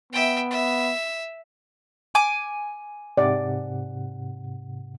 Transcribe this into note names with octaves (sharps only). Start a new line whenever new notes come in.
B3 E5 G5
E5
G#5 D6
G#2 C3 D5 F#5